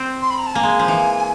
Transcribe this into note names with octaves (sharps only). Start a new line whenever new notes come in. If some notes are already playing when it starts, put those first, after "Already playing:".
Already playing: C4
C6
B5
A#5
A5
A#3 G#5
G#3
F3
E3